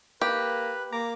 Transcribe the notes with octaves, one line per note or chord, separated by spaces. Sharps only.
A#3 G4 B4
A#3 A#5 D6